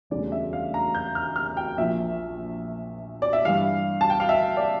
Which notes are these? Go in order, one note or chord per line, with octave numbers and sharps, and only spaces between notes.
E1 D2 C#3 G3 D5
E5
F5
A#5
G6
F6
F6
G5
A#1 A#2 F3 E5
D5
E5
G2 E3 G3 F5
A5
G5
F5
E5
D5